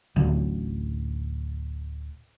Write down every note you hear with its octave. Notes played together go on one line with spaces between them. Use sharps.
D1 A1 D2